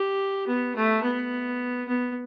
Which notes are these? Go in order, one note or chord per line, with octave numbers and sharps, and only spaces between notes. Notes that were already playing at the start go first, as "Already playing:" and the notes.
Already playing: G4
B3
A3
B3
B3